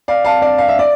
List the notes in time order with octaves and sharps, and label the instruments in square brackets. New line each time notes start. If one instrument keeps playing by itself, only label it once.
[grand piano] D5 F5
F5 A5
D5 F5
F5
E5
D5